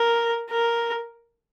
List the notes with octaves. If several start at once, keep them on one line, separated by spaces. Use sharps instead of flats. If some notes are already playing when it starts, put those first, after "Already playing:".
Already playing: A#4
A#4